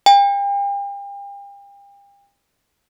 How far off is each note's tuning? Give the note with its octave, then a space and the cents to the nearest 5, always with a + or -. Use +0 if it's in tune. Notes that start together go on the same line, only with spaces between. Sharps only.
G5 +40